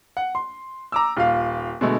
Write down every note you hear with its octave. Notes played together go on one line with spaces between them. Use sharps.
F#5
C6
A#5 D6 E6
D#1 F4 F5
B2 D3 G#3 A3